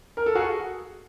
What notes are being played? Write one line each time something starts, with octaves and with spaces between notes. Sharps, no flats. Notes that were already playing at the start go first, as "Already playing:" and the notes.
A#4
A4
F#4 G#4